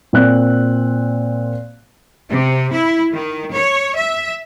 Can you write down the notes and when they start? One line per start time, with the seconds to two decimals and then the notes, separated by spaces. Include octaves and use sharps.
0.13 A#2 C4 F#6
2.30 C3
2.73 E4
3.12 D#3
3.53 C#5
3.96 E5